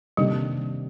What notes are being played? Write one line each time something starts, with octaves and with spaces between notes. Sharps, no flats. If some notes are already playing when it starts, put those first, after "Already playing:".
C3 D#3 G3 A#3 D4 G4